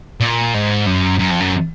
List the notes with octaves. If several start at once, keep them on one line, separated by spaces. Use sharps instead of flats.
A#2
G#2
F#2
F#2
F2
F#2